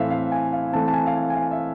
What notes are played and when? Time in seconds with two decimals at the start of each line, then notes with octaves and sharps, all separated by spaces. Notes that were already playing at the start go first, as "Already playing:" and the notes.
Already playing: A2 E3 A3 C4 E5 F5
0.10 F5
0.32 G#5
0.53 F5
0.73 E3 A3 C4 A5
0.88 A5
0.93 G#5
1.07 F5
1.15 G#5
1.30 G#5
1.36 F5
1.51 E5